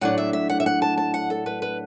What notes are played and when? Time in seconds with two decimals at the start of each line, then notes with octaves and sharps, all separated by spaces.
0.01 A2 F#3 D4 F#5
0.18 E5
0.33 E5
0.49 F#5
0.60 E5
0.66 F#5
0.82 A5
0.98 A5
1.14 F#5
1.30 A4
1.46 B4
1.62 B4